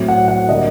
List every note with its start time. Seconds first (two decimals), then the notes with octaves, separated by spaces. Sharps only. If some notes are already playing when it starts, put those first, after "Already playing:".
Already playing: A2 F#3 C4
0.08 F#5
0.28 F#5
0.49 D3 G3 A#3 D#5